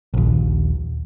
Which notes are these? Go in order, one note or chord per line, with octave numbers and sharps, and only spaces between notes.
A#1 D#2